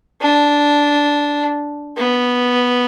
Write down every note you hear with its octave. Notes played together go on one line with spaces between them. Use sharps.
D4
B3